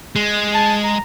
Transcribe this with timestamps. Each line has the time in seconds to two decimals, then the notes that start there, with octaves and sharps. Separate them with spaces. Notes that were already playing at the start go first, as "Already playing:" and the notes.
0.16 G#3
0.54 A5
0.84 A#5